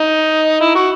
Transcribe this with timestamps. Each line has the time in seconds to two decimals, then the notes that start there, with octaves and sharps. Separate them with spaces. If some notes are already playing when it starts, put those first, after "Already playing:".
Already playing: D#4
0.61 E4
0.75 F#4